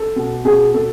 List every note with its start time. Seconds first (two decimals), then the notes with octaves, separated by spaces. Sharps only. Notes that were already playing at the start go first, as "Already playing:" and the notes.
Already playing: A4
0.16 B2
0.45 B2 G#4
0.74 B2 A4